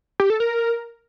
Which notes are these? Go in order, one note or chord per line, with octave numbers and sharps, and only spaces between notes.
G4
A4
A#4